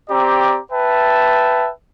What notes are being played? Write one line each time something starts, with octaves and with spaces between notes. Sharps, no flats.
C4 G4 D5 A#5
B4 E5 G5 A5